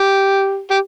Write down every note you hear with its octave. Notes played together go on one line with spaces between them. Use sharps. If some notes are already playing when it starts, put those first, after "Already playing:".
Already playing: G4
G4